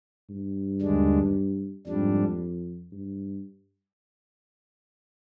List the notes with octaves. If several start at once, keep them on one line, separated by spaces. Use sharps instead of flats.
G2
D#2 D3 G#3 D4
F2 G#2 G3 D4
G2